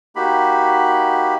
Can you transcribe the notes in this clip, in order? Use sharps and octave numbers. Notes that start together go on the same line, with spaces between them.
A#3 D#4 F#4 G4 B5